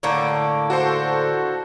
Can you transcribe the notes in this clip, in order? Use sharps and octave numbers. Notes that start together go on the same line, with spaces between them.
A2 D3 A#3
F#4 A4 C5